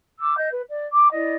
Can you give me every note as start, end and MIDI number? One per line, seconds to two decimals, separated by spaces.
0.20 0.37 86
0.20 0.37 88
0.37 0.47 75
0.37 0.47 91
0.51 0.62 71
0.69 0.86 74
0.92 1.12 86
1.12 1.35 64
1.12 1.35 74
1.12 1.35 75